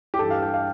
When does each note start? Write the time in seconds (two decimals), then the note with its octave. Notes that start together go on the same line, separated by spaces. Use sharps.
0.14 G4
0.19 G2 E3 A4
0.30 F5
0.42 G5
0.54 F5